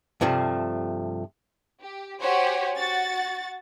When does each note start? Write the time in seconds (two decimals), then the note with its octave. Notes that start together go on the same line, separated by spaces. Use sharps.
0.21 G2 C3 F3 A3
1.81 G4
2.20 F#4 G4 C5 C#5 F#5 G#5
2.77 F#4 F#5 A6